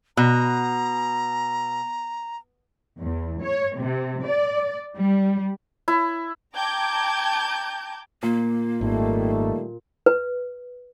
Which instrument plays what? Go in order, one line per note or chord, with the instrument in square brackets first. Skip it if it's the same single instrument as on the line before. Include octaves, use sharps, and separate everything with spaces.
[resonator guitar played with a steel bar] B2 [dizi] A#5
[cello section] E2
C#5
C3
D5
G3
[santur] E4
[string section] G5 A5 A#5 D6 G6 G#6
[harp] A#2 [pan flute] A#3
[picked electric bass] G#1 [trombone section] D#3 G3 A3
[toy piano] B4